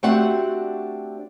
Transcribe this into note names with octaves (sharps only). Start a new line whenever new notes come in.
A3 C4 D4 F#4 G4 F#5